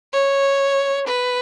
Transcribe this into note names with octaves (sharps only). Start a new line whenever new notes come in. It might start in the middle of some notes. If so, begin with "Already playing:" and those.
C#5
B4